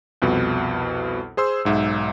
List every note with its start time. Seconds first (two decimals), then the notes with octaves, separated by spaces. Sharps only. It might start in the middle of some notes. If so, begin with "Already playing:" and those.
0.22 C2 F2 B2
1.37 G#4 C5 C6 E6
1.65 B1 G#2 E5